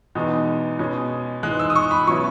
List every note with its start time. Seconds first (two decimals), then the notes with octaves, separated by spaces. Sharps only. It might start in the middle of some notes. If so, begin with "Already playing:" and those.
0.15 E2 B2 G#3 D#4
0.79 B2 G#3 C#4
1.43 G#2 E3 G#3 F#6
1.59 E6
1.70 D#6
1.76 C#6
1.91 B5
2.07 B2 F#3 C#4 E4 C#6